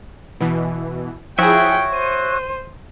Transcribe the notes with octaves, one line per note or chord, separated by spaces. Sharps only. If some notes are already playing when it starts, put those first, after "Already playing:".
B2 E3
F3 E4 F#4 G#4 C#5 E5 G5
C5 D#7